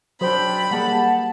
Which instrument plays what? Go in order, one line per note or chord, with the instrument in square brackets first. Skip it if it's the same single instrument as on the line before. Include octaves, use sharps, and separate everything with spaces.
[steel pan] F#3 C5 [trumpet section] C4 D4 G5 [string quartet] B5
[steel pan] G3 A#3 G#4 [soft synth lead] F#5 [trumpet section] A5